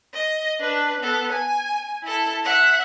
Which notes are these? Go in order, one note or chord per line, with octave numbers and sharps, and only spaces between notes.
D#5
D4 B4
B3 A4
G#5
E4 A4
E5 F#5